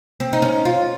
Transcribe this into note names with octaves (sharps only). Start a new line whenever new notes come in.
C4
D#4
C#4
F4